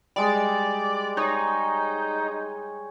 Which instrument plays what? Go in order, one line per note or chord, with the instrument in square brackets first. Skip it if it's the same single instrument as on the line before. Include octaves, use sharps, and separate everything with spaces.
[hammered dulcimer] G3 G#3 D#5 [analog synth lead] D5
[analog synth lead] D#4 [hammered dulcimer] C#5